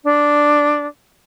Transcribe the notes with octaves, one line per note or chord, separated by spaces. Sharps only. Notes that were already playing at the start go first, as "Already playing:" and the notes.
D4